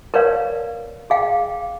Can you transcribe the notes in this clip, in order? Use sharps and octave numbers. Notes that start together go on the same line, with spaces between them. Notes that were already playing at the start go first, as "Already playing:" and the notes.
A#4 B4 C#5 D5 F5
G#4 F5 G5